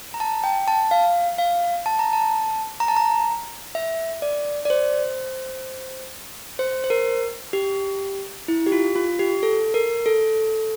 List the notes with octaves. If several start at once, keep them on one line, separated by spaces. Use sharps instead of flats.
A#5
A5
G5
A5
F5
F5
A5
A#5
A5
A#5
A5
A#5
E5
D5
D5
C5
C5
C5
A#4
G4
E4
G4
F4
F4
G4
A4
A#4
A4